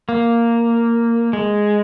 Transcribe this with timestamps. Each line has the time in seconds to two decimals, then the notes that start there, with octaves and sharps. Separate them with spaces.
0.09 A#3
1.33 G#3